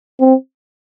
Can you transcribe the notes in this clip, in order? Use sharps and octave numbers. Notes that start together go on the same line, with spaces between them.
C4